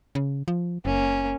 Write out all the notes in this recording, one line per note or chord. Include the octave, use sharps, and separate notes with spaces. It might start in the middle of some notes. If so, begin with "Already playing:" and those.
C#3
F3
F#1 A#3 C#4